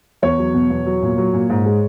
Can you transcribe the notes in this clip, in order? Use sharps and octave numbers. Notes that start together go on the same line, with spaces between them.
E2 C#5
F#3
B2
E2
F#3
A#2
F#3
A#2
G#2
G#3